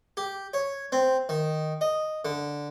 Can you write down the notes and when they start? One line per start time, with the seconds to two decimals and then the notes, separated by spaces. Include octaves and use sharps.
0.17 G4
0.54 C#5
0.92 C4
1.29 D#3
1.81 D#5
2.25 D3